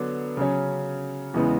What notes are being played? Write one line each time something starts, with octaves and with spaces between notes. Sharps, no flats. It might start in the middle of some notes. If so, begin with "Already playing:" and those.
Already playing: D3 F#3 B3 D4
C#3 F#3 C#4
E2 C#3 E3 G#3 B3